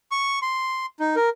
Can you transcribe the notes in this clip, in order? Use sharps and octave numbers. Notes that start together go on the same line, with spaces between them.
C#6
C6
D#4
A#4